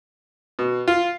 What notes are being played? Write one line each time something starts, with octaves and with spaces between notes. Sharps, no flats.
B2
F4